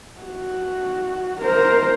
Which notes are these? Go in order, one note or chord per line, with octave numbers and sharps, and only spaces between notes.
F#4
A#4 C5